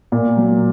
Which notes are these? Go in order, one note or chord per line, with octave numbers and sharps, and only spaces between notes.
A#2
F#3